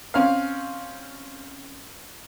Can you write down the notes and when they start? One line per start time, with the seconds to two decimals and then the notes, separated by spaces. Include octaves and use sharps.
0.14 C4 C#4 F5